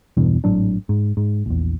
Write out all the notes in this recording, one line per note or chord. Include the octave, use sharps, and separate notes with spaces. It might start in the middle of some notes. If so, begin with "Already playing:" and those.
E2 G2 B2 E3
G#1 A2 F#3 D4
G#2
G#2
A#1 E2